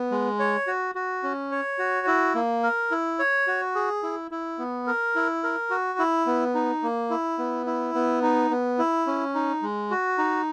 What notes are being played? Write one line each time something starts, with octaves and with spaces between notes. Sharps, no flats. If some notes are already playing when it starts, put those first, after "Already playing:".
Already playing: B3
G#3
C#5
F#4
F#4
C#4
C#5
F#4
E4
A#3
A#4
E4
C#5
F#4
G#4
E4
E4
B3
A#4
E4
A#4
F#4
E4
B3
D#4
A#3
E4
B3
E4
B3
D#4
B3
E4
C#4
D#4
G#3
F#4
D#4